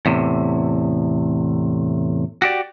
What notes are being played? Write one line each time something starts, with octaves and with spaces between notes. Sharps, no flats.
E2 A2 C3
F#4 G4 D5